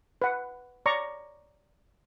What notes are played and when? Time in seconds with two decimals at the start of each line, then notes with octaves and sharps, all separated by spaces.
0.22 B4 F#5
0.86 C#5 D5 A#5 C#6